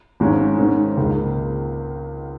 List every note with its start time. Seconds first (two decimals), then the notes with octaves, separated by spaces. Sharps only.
0.20 G#1 G#2 G#3 C#4
0.58 G#2 D#3 C#4
0.97 C#2 C#3 A#3 D#4